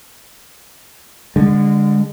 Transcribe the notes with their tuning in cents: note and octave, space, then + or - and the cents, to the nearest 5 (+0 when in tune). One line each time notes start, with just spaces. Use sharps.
D3 +0 G#3 -30